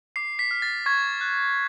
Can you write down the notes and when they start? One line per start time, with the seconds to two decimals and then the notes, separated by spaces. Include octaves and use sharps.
0.16 D6 C7
0.39 B6
0.51 F6
0.62 A6
0.86 C#6 G#6
1.21 F#6